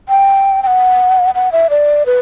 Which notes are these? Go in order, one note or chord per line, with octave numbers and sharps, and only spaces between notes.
G5
G5
F#5
F#5
E5
D5
B4